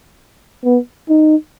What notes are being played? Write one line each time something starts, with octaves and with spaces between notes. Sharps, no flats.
B3
D#4